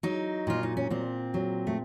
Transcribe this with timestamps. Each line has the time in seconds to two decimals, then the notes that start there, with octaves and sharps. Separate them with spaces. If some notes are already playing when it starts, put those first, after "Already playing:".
0.03 F#3 D#4
0.47 A#2 F4
0.63 D#4
0.77 C#4
0.91 A#2 C4
1.34 F#3
1.67 A3